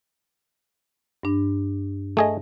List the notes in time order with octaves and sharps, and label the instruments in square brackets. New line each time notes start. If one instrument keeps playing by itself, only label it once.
[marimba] G2 D4
[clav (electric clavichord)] A3 G#4 D#5